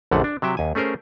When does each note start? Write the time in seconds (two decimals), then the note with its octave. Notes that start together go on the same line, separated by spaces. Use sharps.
0.11 A#1 F#2 D3 A3 F#5
0.24 D4
0.42 C3 F#3 E5 G5
0.57 D#2 G#5
0.75 A3 C#4 G#4 A#4 C5